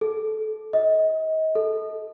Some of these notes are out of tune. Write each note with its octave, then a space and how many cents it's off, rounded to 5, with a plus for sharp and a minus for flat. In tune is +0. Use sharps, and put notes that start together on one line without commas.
A4 -20
D#5 +30
A4 -10